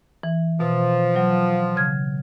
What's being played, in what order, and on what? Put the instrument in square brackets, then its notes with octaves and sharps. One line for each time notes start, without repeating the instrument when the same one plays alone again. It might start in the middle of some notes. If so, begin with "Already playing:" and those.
[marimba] E3
[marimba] B2 [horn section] F3
[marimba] F#3
C#3 F6 G#6